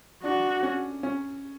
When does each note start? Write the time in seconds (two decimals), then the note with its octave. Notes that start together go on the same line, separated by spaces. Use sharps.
0.23 D4 F#4
0.63 C#4
1.03 C#4